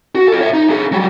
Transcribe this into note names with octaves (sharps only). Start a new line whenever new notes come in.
F#4
F4 A4
C#5 E5
D#4
D4 G#4
F#3 G3